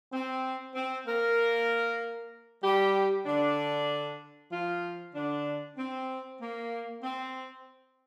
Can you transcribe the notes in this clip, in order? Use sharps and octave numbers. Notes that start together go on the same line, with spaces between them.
C4
C4
A#3 A#4
G3 G4
D3 D4
F3 F4
D3 D4
C4
A#3
C4